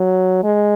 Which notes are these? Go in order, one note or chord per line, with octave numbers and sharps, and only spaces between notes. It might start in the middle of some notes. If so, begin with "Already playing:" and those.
Already playing: F#3
G#3